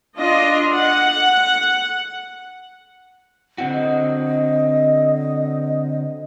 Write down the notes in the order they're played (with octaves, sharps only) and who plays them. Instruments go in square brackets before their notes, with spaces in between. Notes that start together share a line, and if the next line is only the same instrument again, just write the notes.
[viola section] D4 F4 D#5
F#5
[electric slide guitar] D3 C4 F#4
[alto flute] D#5